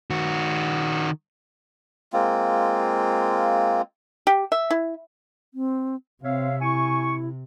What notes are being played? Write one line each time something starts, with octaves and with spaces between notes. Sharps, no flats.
D#3 F#4
G#3 A#3 C4 F4
G4
E5
E4
C4
C3 C4 C#5 E5 F5
E4 G#5 C#6